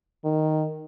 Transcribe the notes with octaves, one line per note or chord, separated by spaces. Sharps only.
D#3